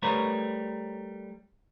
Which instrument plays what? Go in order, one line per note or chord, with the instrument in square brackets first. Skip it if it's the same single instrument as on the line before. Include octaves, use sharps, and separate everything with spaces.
[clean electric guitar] G3 A3 A#4 B4 C#5